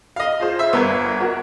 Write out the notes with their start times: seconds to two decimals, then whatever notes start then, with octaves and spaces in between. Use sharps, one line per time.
0.16 D#5 F5
0.40 F4 G#4 C5
0.59 E5
0.73 G1 B3 A#4 G#6
1.20 F#4 A#4